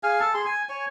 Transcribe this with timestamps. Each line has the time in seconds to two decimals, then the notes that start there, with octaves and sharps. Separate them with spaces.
0.03 G#4 F5 G#5
0.20 A4 A5
0.34 G#4 C6
0.46 G#5
0.69 C#5 G#5